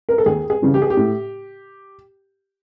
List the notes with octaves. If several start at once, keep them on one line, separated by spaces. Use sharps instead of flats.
A#4
A4
D#2 G#4
G#4
C#3 E3 G3
G4
G#4
G4
A2